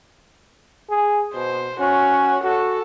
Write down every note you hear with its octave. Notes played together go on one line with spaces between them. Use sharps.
G#4
B2 C5
C#4 F#4
F#4 A4